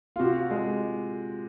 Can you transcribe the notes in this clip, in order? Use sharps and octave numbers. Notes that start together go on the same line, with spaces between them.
F4
C3 F#4
G#3